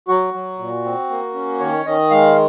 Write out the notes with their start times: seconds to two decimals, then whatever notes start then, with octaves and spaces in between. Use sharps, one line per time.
0.08 F#3 F#4
0.34 F#3
0.59 A#2
0.85 C4
1.10 A#3
1.34 C#4
1.60 D#3 C#5
1.86 D#3 D#5
2.10 G#3 F5